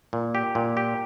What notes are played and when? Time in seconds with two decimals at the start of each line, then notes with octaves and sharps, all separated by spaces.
0.13 A#2
0.35 G4
0.55 A#2
0.77 G4